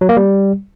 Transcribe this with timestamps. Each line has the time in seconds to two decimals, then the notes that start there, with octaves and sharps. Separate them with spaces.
0.01 F#3
0.09 A#3
0.17 G3